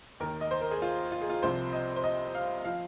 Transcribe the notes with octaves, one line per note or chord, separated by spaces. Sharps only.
D#2 D#3 A#4
D#5
C5
A#4
G#4
F4
F4
G#4
F4
C2 C3 F3 C5
D#5
C5
D#5
F5
F3 F5